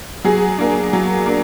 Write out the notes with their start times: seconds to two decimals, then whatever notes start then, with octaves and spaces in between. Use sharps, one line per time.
0.24 F#3 G#4
0.58 A#3 D4
0.93 F#3
1.26 A#3 D4